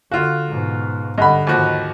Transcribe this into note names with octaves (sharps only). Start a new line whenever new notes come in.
D3 F4 F#4 F5
G#2 B2
G2 D3 D#5 F#5 B5
D#2 G#2 F3 F#4